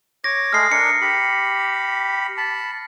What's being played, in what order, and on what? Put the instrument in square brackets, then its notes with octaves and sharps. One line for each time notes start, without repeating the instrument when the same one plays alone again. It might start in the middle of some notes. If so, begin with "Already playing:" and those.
[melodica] C#5 D6 [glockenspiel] A#6
[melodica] G#3 A3 G#4 [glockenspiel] F6 C7
[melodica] D4 A#4 [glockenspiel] C#7
[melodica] G4 B5
A5 B5